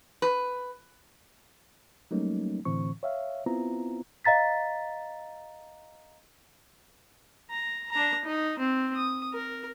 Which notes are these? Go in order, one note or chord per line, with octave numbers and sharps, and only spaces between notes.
B4
F#3 G3 A3 A#3 C#4 D#4
A2 D3 E3 C4 C#6
C#5 E5 F5
B3 C4 E4 F4 A#5
D#5 F5 A#5 A6 B6
A#5
D4 A#5
D#4
C4
D#6
A#4